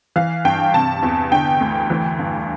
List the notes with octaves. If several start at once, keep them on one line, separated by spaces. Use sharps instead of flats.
E3 F5
G2 G5
C3 A5
E2
D3 G5
D2
E3
G2